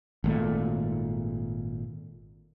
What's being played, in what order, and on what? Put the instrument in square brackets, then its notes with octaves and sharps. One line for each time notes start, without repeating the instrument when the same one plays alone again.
[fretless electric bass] G#1 A#2 A3